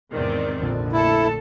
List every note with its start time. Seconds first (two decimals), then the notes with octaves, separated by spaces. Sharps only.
0.12 E2 G#2 C3 D#3 C4 D5
0.60 A#1 F2 D3
0.93 A3 E4 A4 A5